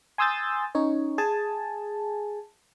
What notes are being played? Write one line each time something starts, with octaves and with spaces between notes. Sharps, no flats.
G#5 C6 D#6 E6 G6 A6
C#4 D#4 C#5
G#4 G#5 A5